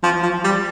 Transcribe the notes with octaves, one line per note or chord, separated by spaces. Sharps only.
F3
F3
G3